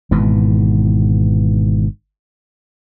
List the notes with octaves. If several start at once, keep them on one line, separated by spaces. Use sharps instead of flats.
G#1 G#2 B2 E3